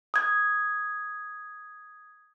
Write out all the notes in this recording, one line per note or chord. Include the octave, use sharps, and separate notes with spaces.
D#6 G#6